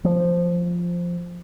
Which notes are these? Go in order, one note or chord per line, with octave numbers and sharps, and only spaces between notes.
F3